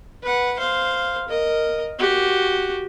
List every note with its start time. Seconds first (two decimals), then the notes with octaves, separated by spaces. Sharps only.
0.23 B4 F#5
0.59 C5 F5
1.28 A#4 D#5
1.99 F#4 G4